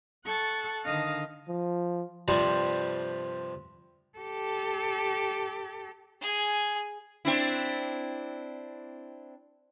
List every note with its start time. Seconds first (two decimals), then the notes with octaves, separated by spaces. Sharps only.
0.24 A4 F#5 C#6 A6
0.85 D3 D#3 D#5 F5 A5 D#6
1.48 F3
2.28 G2 C3 F3 G3
4.19 G4 A4
6.21 G#4 G#5
7.25 C4 D4 E4